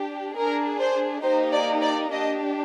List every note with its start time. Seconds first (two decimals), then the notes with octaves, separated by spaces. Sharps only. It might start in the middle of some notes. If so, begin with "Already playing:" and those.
Already playing: D4 G4
0.35 D4 G#4 A#4
0.79 C5
1.23 A#3 D#4 G4 C5
1.53 D5
1.82 D5
2.11 D4 G4 D#5